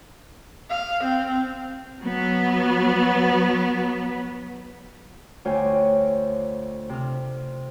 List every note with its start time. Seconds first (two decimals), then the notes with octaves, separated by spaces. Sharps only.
0.70 F5
1.04 C4
2.01 F#3 B3
5.45 D2 F4 C5 C#5 G5 G#5
6.89 C3 F6